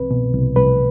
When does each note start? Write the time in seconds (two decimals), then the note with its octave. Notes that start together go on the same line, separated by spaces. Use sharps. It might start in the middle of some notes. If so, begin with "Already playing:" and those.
Already playing: C2 C4 B4
0.11 B2
0.34 C2
0.56 C2 B4